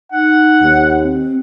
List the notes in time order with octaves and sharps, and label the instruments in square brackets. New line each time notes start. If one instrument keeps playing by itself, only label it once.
[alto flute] D#4 [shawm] F#5
[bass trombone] D#2
[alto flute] C4